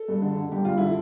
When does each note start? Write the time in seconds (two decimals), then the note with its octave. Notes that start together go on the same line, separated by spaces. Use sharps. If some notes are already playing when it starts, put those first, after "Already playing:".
Already playing: A4
0.08 G2
0.22 D3
0.37 D3
0.52 G2 G4
0.65 G2 F4
0.78 D3 E4